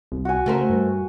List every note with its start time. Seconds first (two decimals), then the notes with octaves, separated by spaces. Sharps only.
0.12 C2
0.25 F#4 G#5
0.46 C#3 A3 A#4 C5
0.70 G2